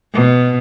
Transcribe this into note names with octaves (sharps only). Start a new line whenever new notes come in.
B2